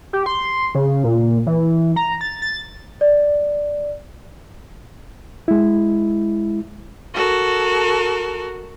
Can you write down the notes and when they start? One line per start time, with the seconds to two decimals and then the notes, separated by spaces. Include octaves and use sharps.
0.13 G4
0.26 C6
0.75 C#3
1.04 A#2
1.47 E3
1.96 A#5
2.21 A6
2.42 A6
3.01 D5
5.48 G#3 E4
7.14 F#4 A4 A#4